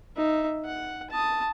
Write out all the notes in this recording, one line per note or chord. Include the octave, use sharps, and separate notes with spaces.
D#4 E5
F#5
A5 D#6